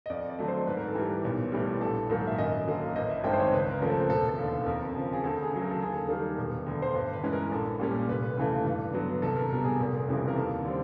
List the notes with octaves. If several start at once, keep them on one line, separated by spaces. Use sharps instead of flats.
D#5
F2 D5
D5
D3 F#3 A3
C5
G#2 B4
A#4
A4
E3 G3 A#4
B1
A2 E3 G3
A#1 A4
G#2 D#3 F#3 A#3
E5
F#2 D#5
D3 F#3 A#3
A1 D#5
E5
G2 D#3 G#3 C4 G5
C5
C#5
C#2 B4
A#4
C#3 F3 A3 C4 A#4
A4
E1 A4
A4
D#2 D3
A4
F2 A#4
C#3 F3
G#4
D2 A4
G#4
C#3 F#3
A#4
A4
D#2 G#4
A4
D#3 G3 A#3
E1
D2 D3
C5
G2 B4
B4
E3 G#3 C#4
A#4
A#1 A4
A#2 G3 A#3 C#4
F1 B4
D#2 C#3 E3 A3
G2
D3 F#3 B3
C2 A4
A#4
B2 G3 A#4
G#4
F1
F2 C#3 E3 G3
A#4
D#2 A4
D3 G3 C4